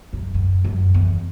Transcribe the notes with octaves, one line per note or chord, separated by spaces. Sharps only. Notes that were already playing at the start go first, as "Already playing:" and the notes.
F#2
F#2
F#2
E2